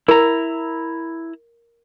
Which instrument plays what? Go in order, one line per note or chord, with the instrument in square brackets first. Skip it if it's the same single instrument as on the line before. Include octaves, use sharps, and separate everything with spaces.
[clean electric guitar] E4 A#5 [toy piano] A#4